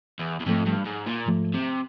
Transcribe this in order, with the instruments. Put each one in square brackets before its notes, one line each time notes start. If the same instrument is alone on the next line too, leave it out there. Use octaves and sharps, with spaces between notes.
[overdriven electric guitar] E2
E2
[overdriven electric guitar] F2 [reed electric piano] G#2 F3 A3
[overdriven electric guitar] G2
G#2
A#2
[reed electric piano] G#2 F3 A3
[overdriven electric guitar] C3